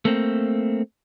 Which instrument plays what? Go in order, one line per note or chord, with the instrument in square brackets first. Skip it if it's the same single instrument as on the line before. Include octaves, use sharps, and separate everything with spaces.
[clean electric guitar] A3 A#3 C4